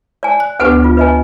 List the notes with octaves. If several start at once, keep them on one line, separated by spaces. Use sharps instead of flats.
D5 G#5
F#6
D2 B3 D4 G4 B4 F#5
F4
B4 D#5 G#5